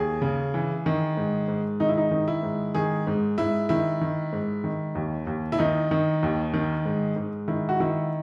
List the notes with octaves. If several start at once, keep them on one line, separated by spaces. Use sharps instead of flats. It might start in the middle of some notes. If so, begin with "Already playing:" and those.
Already playing: D#2 G#4
C#3
E3
D#3
G#2
G#2
D#3 D#4
E4
D#4
D#3
E4
G#2
D#3 G#4
G#2
G#2 E4
D#3 E4
D#3
G#2
D#3
D#2
D#2
E4
D#3 D#4
D#3
D#2
D#3
G#2
G#2
D#3 E4
F#4
D#3 E4